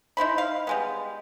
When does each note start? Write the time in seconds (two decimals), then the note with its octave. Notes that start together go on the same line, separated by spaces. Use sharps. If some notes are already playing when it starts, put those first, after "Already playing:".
0.17 D#4 E4 C5 B5
0.38 F5
0.67 G3 G#3 B3